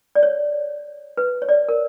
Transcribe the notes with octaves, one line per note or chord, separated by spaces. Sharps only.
D5
C#5
B4
C#5
D5
A#4